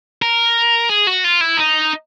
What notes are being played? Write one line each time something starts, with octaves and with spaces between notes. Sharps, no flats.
A#4
G#4
F#4
F4
E4
D#4